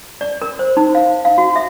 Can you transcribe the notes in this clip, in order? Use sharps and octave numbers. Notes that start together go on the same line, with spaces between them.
D5
A#4
C5
D#4
F5
F5
F#4
E5